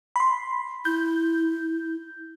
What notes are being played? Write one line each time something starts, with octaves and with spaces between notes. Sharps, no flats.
B5 C6
E4 G6